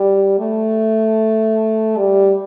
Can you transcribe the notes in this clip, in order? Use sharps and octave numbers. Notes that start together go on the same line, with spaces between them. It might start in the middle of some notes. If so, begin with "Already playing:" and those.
Already playing: G3
A3
G3